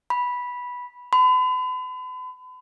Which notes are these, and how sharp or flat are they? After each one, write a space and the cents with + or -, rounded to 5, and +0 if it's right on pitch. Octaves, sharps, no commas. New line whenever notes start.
B5 -10
B5 +40